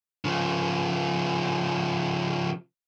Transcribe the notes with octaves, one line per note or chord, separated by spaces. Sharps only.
C#3 F3